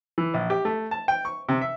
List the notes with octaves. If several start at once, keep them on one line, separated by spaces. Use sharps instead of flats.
E3
A#1
G4
A3
A5
G5
C#6
C3
E5